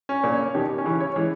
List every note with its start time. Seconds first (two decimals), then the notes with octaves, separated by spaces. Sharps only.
0.09 C#4
0.24 A#2 C#3
0.32 C#5
0.55 B2 D#3 G4
0.78 C#4
0.85 C#3 E3
1.00 C#5
1.16 E3 G#3